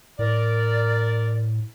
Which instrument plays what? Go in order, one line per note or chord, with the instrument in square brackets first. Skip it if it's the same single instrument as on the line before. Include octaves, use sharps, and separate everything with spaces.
[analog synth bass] A2 [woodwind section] A#4 D5